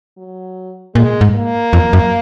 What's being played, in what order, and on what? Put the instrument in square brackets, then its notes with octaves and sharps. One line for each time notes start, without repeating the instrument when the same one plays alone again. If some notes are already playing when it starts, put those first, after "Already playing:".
[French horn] F#3
[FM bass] A#2 [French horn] G#3
[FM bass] G#2
[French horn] A#3
[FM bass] F2
F#2